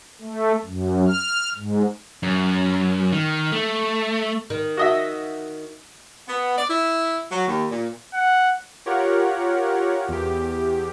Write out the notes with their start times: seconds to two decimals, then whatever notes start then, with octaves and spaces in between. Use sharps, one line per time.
0.21 A3
0.65 F#2
1.08 F6
1.55 G#2
2.23 F#2
3.12 D#3
3.52 A3
4.50 D#3
4.77 F#4 D#5 E5
6.27 B3
6.57 D5
6.69 E4
7.31 F#3
7.46 D#2
7.71 A#2
8.14 F#5
8.86 F4 G4 A#4 C#5 F#5
10.08 E2 G4